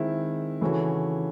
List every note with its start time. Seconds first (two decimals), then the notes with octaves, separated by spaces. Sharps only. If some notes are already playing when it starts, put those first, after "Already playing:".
Already playing: D#3 G#3 C4 E4
0.61 C#3 E3 A3 C#4 F#4